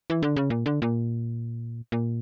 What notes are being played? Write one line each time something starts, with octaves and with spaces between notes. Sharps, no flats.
E3
D3
C#3
A#2
D3
A#2
A#2